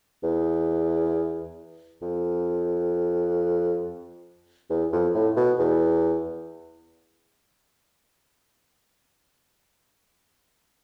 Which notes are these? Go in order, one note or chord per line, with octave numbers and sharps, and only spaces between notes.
E2
F2
E2
F2
A2
B2
E2